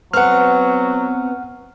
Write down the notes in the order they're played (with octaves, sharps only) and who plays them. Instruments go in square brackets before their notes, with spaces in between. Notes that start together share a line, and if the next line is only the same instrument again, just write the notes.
[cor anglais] F#3 [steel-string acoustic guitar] B3 C4 [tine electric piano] F#5 F6